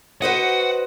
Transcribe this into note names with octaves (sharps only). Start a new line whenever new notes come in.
F#4 B4 C5 D#5 F#5